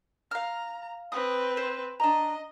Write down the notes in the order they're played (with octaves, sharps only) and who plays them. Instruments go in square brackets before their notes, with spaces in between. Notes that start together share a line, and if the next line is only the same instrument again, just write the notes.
[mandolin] F5 F6 [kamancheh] A#5
[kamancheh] C4 B4 [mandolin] D#6
[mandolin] C5
[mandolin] D4 A#5 [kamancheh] D#5